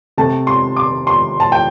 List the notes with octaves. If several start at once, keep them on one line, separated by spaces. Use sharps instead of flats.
C3 A3 A5
C6
D6
C6
A5
G5